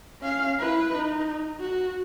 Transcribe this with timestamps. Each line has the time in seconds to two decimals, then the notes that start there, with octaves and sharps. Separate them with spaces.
0.21 C#4 F5
0.59 E4 B4
0.96 D#4
1.60 F#4